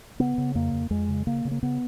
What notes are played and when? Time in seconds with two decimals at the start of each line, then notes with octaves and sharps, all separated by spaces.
0.20 C#3 B3
0.38 C#3
0.55 F2 A#3
0.73 F2
0.91 F2 G#3
1.09 C#3
1.27 C#3 A#3
1.45 C#3
1.51 A#3
1.63 C#3 B3